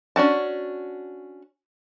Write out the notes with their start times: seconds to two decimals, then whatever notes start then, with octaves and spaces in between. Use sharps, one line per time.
0.16 C#4 D4 F#4 A5